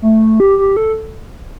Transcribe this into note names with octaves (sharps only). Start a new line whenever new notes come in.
A3
G4
G4
A4